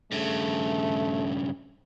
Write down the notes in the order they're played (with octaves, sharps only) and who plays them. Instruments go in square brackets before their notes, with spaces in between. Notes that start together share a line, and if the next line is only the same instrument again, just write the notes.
[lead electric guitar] G2 C#3 [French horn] A3